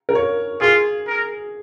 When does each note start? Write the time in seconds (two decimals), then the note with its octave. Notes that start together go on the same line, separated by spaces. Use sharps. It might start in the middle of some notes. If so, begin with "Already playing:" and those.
0.09 A#4
0.15 C#5
0.61 F4 G#4
1.07 A#4